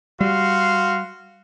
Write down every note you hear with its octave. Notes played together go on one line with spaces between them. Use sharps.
G3 F#4 F5 C6